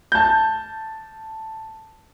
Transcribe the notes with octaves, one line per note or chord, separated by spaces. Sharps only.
A5 G6